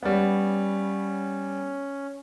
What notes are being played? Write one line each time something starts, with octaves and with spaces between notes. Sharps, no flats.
G3 B3 C#4